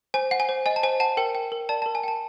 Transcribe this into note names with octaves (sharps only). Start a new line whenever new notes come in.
C5 G#5
F#5
G#5
C5
D#5 G#5
A5
C5 G#5
F#5 A5
A#4 G5
G5
A#4
D5 A5
A5
A#4
G#5
G5 A5